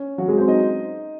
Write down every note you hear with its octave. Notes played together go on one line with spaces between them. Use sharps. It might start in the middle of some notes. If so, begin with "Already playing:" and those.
Already playing: C#4
F#3 F#4
G#3 G#4
C4 C5
D#4 D#5